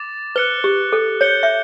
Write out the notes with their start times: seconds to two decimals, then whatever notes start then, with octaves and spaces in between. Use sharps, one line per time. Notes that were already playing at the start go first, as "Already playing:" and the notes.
Already playing: D6 A6 E7
0.36 B4 F#6 C#7 G7
0.64 G4
0.93 A4
1.21 C#5 G6 C#7 G7
1.43 E5